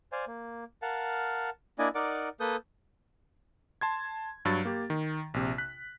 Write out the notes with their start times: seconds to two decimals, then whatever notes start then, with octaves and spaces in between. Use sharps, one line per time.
0.12 C5 D5 F5 G#5
0.27 A#3
0.82 A#4 F5 F#5 A5
1.79 A#3 D4 E4 D5 D#5 G#5
1.95 D#4 A#4 D5 F#5 D6
2.40 A#3 A4 B4 D#6 G6
3.81 A5 C6 G#6
4.45 G2 F#3 F#4 A6
4.65 A#3 G4
4.90 D#3
5.34 A#1 C3
5.58 F#6 B6